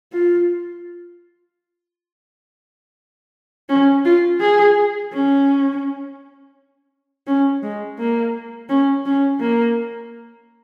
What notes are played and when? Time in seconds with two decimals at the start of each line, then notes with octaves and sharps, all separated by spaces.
0.13 F4
3.69 C#4
4.05 F4
4.41 G#4
5.13 C#4
7.27 C#4
7.62 G#3
7.99 A#3
8.69 C#4
9.06 C#4
9.40 A#3